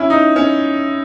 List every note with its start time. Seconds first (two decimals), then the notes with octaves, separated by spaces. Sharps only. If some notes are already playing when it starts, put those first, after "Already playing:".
Already playing: C#4 E4
0.10 D#4
0.36 C#4